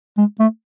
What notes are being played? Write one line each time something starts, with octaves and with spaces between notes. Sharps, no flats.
G#3
A3